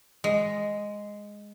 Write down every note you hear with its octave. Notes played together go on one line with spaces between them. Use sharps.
G#3